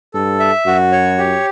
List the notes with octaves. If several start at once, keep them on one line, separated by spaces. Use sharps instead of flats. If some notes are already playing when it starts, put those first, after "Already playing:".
G2 A4
E5
F#2 F#4
C#5
G4